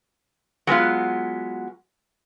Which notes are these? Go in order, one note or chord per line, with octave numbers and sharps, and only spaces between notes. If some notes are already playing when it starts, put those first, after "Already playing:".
F#3 G#3 B3 F4